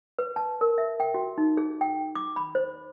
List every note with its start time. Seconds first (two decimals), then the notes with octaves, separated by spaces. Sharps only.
0.19 B4
0.36 A5
0.61 A#4
0.78 E5
1.00 G5
1.14 F#4
1.38 D#4
1.57 G#4
1.81 G5
2.15 D6
2.36 B5
2.55 C5